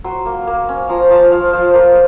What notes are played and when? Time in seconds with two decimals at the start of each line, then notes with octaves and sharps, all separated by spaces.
0.04 F#3 C6
0.26 A#3
0.47 A#3
0.69 C#4
0.89 F3 A#5
1.10 F3 A5
1.32 F3 F5
1.53 F3 C5
1.74 A#3 A#4